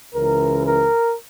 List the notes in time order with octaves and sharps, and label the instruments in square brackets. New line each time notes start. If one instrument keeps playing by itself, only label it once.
[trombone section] C#2 C#3 E3 A#4
A#4